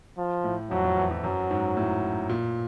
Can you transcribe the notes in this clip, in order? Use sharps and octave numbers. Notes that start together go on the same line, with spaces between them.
F3
A2
F2 F#3
F2
E2
F2
F#2 F#3
G#2
A2
A#2